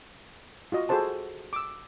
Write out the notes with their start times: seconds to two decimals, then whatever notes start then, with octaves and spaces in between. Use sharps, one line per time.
0.72 F4 F#4 D#5
0.89 F#4 G#4 A4 C5 A5
1.53 D6 E6